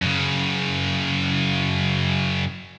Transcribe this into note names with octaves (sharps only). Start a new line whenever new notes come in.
F#2 C#3